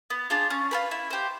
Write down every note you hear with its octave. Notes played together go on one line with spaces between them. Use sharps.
B3
D4 F4 G#4
C#4
F4 G#4 B4
E4
G4 C5